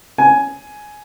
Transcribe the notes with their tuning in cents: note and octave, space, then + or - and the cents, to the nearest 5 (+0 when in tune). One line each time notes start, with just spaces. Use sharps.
G#5 +10